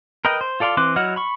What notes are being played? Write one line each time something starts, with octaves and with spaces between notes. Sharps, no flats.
A#4 B4 D#5 G5
C5
F4 A4 D5 F5 C6
E3 C4 C6 D6 F#6
F#3 E4 D#5 F#5 F6
B5 C#6